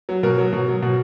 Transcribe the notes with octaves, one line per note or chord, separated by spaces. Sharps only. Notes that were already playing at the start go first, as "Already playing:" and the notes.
F#3
B2 A#4
F#3
B2
F#3
B2